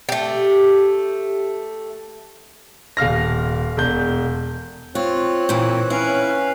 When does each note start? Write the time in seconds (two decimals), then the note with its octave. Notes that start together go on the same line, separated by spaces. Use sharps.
0.09 A3 G4
2.97 D#1 F5 F6 A#6
3.77 E1 G6
4.95 C4 F4 C#5 F#6
5.49 A#2 E3
5.90 C#4 E4 B4 F5